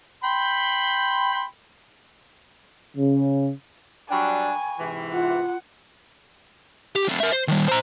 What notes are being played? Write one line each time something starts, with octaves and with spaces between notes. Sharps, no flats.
G5 B5 C6
C#3
F#3 G3 D4 G5 G#5 B5 C#6
G#2 C3 E3
F4 F#5
G4
A3 C4
A#4 E5
C5
D#3 G3
C5 A#5